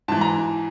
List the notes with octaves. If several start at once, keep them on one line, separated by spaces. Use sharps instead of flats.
G#2 E3 A5
A#5